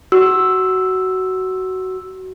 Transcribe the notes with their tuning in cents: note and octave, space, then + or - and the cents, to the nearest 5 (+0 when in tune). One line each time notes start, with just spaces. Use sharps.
F#4 +15 E6 +0